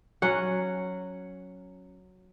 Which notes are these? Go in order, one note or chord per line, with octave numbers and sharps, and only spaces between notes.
F#3 C#4 F#5